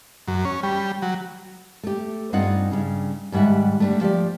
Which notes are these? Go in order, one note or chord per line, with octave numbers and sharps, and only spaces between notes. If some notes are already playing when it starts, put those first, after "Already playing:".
F#2
C#4
G3
F#3
A3 G4
G2 C4 D#4 F4 F#5
G2 C#3
D#2 G#2 G3 E5 F#5
D3 G3 A3
F3 G4 D5